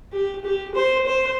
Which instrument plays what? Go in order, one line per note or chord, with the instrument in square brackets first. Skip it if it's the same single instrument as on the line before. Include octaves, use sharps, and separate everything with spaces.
[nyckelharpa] G4
G4
C5
C5